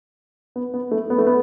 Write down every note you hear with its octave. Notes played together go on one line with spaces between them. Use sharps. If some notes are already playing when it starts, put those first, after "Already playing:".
B3
B3
A3
B3
A3
B3